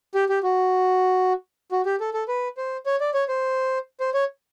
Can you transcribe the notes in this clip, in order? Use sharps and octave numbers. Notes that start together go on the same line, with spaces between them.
G4
G4
F#4
F#4
G4
A4
A4
B4
C5
C#5
D5
C#5
C5
C5
C#5